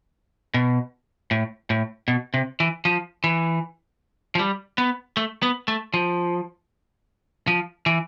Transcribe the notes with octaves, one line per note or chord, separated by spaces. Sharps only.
B2
A2
A2
B2
C3
E3
F3
E3
F3
G3
B3
A3
B3
A3
F3
F3
E3